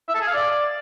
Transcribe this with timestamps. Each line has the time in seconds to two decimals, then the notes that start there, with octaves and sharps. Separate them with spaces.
0.08 E5
0.15 A4
0.21 G#4
0.27 F5
0.33 D5